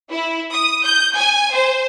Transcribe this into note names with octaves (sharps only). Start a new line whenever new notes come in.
E4
D#6
G6
G#5
C5